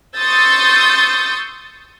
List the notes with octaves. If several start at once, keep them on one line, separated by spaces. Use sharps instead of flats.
C6 C#6 D#6 E6 G6 A6